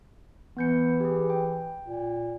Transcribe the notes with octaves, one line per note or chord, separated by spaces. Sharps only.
E3 B3 G6 C#7
G4 G#4
G5
A#2